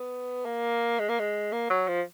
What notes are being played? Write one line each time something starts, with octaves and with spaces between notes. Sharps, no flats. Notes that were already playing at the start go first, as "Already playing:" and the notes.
Already playing: B3
A#3
G#3
A#3
G#3
A#3
F#3
F3